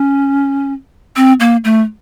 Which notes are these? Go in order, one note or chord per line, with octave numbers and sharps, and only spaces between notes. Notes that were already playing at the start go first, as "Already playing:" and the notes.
Already playing: C#4
C4
A#3
A3